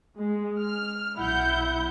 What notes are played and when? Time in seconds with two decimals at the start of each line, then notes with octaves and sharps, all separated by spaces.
0.18 G#3
0.60 F6
1.17 B1 E4 F#5 G6